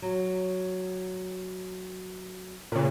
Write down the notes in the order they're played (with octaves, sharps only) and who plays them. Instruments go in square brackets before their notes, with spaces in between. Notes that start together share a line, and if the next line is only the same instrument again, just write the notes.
[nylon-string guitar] F#3
[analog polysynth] A#2 C#3